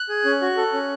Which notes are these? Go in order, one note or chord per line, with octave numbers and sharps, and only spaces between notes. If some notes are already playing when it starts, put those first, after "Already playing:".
Already playing: F#6
G#4
C#4
F#4
A4
C#4